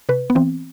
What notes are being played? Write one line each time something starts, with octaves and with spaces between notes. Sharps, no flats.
C3 B4
B3
E3 C4